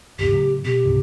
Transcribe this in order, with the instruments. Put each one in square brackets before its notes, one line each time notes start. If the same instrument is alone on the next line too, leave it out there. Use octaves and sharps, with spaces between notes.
[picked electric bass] G1 D#2 B2 [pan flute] G4
[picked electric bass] A2 C#3 F#3
[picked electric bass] B2 [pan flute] G4
[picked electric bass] C#2 G#2 C3